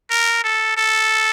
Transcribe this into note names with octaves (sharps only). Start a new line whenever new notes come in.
A#4
A4
A4